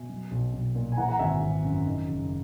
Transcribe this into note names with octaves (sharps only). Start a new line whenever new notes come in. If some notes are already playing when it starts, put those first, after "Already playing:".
Already playing: B2 E5 G#5
F#3
B1
B1
A#2
G#5
E3 F#5 A#5
F#5 A#5
G#1 E5 G#5
G#1
F#2
D#3
F#1